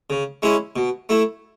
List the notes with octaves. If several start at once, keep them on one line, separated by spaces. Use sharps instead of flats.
C#3
G#3 C#4 E4
B2
A3 E4